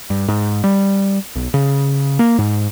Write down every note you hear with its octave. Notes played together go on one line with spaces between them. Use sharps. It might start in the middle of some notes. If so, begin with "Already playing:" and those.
G2
G#2
G3
B1
C#3
A#3
G#2